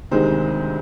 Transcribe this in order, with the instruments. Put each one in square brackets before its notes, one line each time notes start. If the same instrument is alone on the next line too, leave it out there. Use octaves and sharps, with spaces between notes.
[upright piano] D2 C3 D#3 G#3 C5